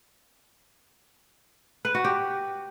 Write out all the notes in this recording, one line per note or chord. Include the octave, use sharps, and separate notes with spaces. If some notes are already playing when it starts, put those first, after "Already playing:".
B4
F#4
G4